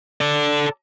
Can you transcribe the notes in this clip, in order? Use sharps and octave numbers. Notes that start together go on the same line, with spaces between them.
A4 D5